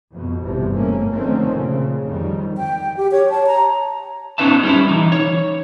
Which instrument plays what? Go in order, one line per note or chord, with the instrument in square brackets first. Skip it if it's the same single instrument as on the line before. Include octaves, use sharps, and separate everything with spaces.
[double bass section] F2 B2
G1 E2 G2 C3 F3
G#2 A3 A#3 C#4
D3 D#3 F3 A3 C4 C#4
A#2 C#3
F2 D#3 G3
[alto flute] G5
G4
C#5
A5
A#5
[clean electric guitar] B3 C#4 D#4 B4 E5 A5
G3 C#4 E4
E3 D#4
C#5